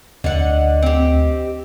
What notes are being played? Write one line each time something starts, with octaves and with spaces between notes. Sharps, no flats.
D2 D3 D#5 F#5
C4 G4